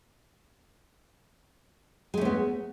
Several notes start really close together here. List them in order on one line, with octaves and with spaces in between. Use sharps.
G#3 A3 C#4 B3